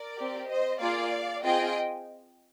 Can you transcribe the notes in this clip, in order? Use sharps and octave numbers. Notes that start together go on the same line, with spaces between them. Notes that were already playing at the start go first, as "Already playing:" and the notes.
Already playing: A#4 D5
C4 G4
C5 D#5
A#3 F4 G#4 D5 F5
C4 F4 G#4 D#5 G5